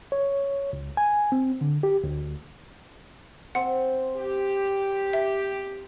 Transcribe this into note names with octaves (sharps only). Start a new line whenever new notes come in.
C#5
C#2
G#5
C4
D3
G4
D2
C4 F#5
G4
E5